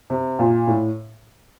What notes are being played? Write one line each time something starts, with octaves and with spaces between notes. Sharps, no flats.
C3
A#2
A2